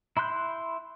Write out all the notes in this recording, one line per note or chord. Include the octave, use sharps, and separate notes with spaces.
E4 B5 C6 F#6 G6